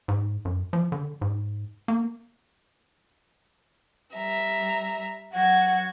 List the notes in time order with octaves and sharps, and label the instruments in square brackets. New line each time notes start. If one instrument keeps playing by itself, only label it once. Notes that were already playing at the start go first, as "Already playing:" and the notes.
[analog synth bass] G#2
F#2
F3
D3
G#2
A#3
[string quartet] G3 E5 A#5
[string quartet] F#3 F#4 G#6 [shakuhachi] F#5